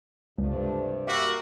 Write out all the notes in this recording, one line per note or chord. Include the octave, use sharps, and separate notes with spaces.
C#2 G2 C3 F3 A3 D4
G3 A#3 F#4 A#4 E5